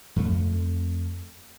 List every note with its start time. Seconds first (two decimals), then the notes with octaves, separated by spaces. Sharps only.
0.16 F2 A3